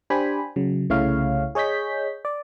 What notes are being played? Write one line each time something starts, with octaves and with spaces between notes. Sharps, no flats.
D4 G4 C5 G5 G#5 B5
C#3 F#3
C2 C#3 A3 E4 C#5 F5
G#4 C#5 D#5 G6 B6
D5